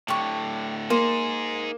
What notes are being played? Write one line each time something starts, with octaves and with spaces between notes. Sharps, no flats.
A2 D3 G4 C#6
A#3 D#4 G#4 C5